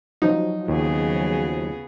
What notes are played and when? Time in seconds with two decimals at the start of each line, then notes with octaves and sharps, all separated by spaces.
0.22 F3 F#3 D#4
0.68 D#2 C#3 B3 G#4